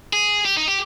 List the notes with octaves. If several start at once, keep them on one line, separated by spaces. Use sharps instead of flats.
G#4
G4
D#4
G4